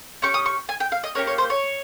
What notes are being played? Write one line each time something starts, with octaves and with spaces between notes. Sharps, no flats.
C#4 G4 C#6
D#6
C#6
G#5
G5
F5
D#5
A#3 C#4 G4 C#5
C#5
C5
C#5